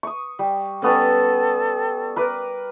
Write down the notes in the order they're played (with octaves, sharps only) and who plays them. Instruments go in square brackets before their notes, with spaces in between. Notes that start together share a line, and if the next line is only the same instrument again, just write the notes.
[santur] C#6 D#6
G3
[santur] G3 B3 C#4 [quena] A4
[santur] A#4 B4 D6